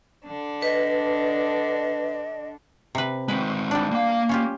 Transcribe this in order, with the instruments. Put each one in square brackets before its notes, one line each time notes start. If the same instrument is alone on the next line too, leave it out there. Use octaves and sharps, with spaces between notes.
[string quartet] D3 D4
[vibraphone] B4 [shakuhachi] D#5
[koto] C3 B4
[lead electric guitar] G#3 C4 [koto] B4
[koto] G3 D4
[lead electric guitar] A#3 F5
[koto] C#4 F4 G4